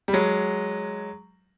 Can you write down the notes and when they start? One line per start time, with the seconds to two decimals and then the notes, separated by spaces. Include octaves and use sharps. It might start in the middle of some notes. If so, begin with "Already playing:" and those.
0.08 G3
0.13 F#3 G#3